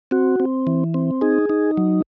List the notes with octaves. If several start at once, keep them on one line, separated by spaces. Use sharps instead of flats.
C4 F#4
C4
E3
C4
D#4 G#4
D#4
F#3